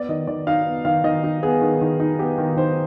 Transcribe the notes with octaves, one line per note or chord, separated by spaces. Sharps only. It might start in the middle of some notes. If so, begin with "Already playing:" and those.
Already playing: B3 D5
D#3 D#5
D#3 D5
D#4 F5
B3
D#3 F5
D#3 D#5
D#4
B3 G#4
D#3
D#3
D#4
B3 G4
D#3
D#3 C5